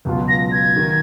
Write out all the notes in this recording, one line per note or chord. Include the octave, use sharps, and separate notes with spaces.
C#2 B2 F#3 B3 F4
A#6
G#6
D#3